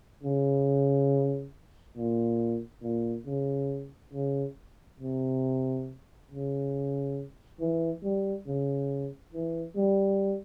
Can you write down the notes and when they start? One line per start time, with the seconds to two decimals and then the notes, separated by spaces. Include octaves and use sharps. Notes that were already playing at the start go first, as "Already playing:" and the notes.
0.23 C#3
1.97 A#2
2.83 A#2
3.27 C#3
4.13 C#3
5.00 C3
6.30 C#3
7.60 E3
8.03 G3
8.47 C#3
9.34 E3
9.76 G3